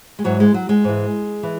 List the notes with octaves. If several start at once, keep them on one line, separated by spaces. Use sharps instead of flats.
G#3
G#2 E3 F#3
G#3
F#3
G#3
G#2 E3
E3